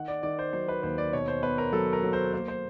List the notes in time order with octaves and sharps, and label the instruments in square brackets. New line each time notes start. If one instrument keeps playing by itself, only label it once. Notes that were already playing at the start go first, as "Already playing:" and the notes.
Already playing: [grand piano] D#3 F#5
D5
D#3 D5
C5
F#3 C5
B4
D#2 C5
D5
B2 C#5
C5
B3 B4
A#4
F#3 A4
A#4
F#3
C5
A#3 C5
C5